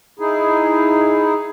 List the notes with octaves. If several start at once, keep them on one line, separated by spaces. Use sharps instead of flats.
D#4 E4 G#4